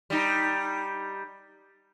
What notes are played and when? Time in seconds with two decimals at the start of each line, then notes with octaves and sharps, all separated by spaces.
0.10 G3 D#4